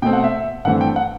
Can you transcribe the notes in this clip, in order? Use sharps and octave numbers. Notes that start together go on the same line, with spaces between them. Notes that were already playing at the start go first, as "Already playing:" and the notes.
B2 A3 C4 G5
F#5
E5
G2 E3 A3 C4 F#5
G5
F#5